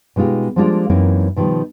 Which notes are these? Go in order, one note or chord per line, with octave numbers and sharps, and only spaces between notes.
B2 G#3 D#4 F4 G4
F3 G3 G#3 A#3 D4 F4
F#2 E3 A#3 C4 D#4 A#4
B2 D#3 F3 G3